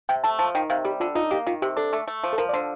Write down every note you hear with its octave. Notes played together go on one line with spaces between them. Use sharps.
C3 G5
A3 A5
F3 A5
D#3 G5
C3 F5
G3 G4
D3 F4
D#4 F4
A#3 G4
D#3 F4
C3 G4
D4 A4
A3
A3
F3
A4
F3 A#4
D5
D3 C5